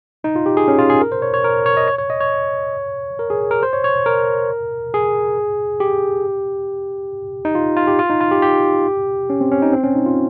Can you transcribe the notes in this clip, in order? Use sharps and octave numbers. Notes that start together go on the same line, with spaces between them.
D#4
F4
G4
G#4
C#4
F4
G#4
A#4
C5
C#5
C#5
A#4
C#5
D#5
C#5
C#5
D#5
C#5
A#4
G#4
A#4
C5
C#5
C#5
A#4
G#4
G4
D#4
F4
F4
G4
F4
D#4
F4
G4
G4
C#4
C4
C#4
D#4
C4
C#4
D#4
F4